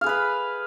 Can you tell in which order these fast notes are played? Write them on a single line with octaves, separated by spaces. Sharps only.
F5 G#4 B4 B5